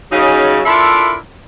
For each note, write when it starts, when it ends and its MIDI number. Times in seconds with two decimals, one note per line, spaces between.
0.12 0.60 49
0.12 0.60 54
0.12 0.60 63
0.66 1.15 62
0.66 1.15 64
0.66 1.15 65
0.66 1.15 69
0.66 1.15 70
0.66 1.15 76